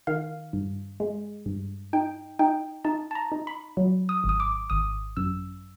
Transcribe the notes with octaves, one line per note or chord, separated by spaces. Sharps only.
D#3 F5
G2
G#3
G2
D#4 G5
D#4 G5
D#4 A5
A5
A#5
D#4
B5
F#3
D#6
G#1
D#6
D6
G#1 D#6
F#2 E6